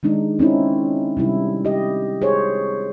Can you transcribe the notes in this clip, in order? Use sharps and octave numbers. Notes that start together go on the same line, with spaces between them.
D#3 G#3 D4 D#4
C4 C#4 D#4 E4
C3 G3 E4
G4 D#5
G#4 C5 C#5